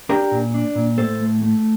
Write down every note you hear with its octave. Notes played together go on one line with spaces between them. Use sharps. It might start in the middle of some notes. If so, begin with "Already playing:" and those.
D4 G4 A#4
A#2
D4
A#2
A2 A4 C5
A3
A3